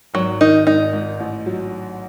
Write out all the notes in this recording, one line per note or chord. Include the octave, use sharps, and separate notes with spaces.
G#1 F#3
D#3 D#4
G#1 D#4
G#2
A1
F#3